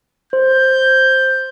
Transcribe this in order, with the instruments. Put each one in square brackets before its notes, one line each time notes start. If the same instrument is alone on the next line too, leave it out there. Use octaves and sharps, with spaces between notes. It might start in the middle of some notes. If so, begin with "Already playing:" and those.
[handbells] C5 [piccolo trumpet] G6